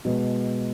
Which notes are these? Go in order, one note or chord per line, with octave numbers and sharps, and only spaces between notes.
B2 G#3 B3